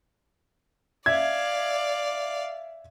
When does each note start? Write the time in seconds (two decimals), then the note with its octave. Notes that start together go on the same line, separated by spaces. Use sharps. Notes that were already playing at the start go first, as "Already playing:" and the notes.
1.06 D5 E5 F5 G#6